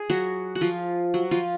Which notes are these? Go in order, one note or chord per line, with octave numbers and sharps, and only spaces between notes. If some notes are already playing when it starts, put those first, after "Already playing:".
Already playing: G#4
F#3 F#4
F#4
F3 F4
F#3 F#4
F3 F4